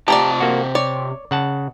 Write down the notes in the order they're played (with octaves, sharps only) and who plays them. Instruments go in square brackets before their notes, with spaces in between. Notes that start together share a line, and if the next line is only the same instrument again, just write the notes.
[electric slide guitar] C3 A5 [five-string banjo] A3 F4 D5 [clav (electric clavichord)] G4 A#5
[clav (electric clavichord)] A#3 F#4
[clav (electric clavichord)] C#5 [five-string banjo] D5
[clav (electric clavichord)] C#3 F#5 A5